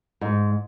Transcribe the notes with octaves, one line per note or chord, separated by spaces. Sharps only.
G#2